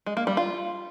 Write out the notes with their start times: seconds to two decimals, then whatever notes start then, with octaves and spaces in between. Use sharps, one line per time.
0.06 G#3
0.17 A#3
0.27 G3
0.37 F4